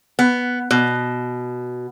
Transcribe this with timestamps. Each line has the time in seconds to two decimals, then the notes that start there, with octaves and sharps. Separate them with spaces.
0.19 B3
0.71 B2